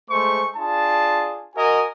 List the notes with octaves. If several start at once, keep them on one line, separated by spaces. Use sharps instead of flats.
G#3 A3 C5 C#6
D4 F4 G#4 A5
F#4 A#4 D#5 G#5